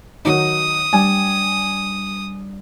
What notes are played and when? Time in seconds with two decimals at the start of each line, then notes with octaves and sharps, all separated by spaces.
0.25 D#3 F#3 D#4 D#6
0.93 G3 D4 G#5